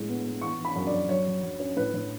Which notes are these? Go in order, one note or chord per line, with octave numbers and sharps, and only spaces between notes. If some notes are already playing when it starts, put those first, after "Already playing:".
Already playing: A2 G#3
B3
B3
E3 C#6
E3
B5
F#2
D5
F#2
F#3 C#5
F#3
F#3
C#4
A2 B4
A2